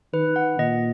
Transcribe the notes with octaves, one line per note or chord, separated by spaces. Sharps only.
D#3 B4
F#5
A#2 D#5